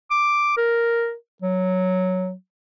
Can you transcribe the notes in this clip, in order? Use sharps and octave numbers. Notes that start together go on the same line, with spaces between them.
D6
A#4
F#3